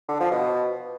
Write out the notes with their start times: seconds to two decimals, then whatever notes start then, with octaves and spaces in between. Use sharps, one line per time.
0.08 D3
0.20 F3
0.31 B2